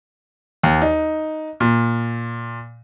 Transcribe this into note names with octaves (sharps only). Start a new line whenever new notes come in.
D#2
D#4
A#2